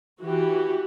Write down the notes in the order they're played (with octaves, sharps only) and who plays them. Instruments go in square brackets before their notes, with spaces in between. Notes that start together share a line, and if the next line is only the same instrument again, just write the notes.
[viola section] E3 F#4 G4